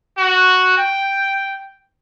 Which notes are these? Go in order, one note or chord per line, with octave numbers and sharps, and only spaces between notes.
F#4
G5